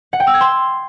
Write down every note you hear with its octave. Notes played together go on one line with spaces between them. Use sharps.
F#5
G5
E6
G#6
C6